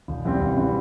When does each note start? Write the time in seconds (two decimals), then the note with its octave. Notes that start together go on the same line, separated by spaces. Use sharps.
0.08 E1
0.24 E2 E3 G3 C4
0.41 E1
0.57 E3 G3 C4